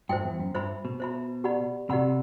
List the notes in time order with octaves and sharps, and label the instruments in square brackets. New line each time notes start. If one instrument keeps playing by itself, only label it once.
[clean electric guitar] G2 [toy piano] C5 E5 G5
[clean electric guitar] E2
F#2
[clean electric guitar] G2 [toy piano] C5 E5 B5
[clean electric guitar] B2
[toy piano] C5 E5 B5
G4 D5 F#5 B5
[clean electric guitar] C3 [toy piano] G4 D5 F#5 B5